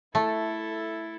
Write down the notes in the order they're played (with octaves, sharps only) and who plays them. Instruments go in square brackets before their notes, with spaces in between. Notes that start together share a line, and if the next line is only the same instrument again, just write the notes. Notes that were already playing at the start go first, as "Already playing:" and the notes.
[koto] A3 [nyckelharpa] E4 A4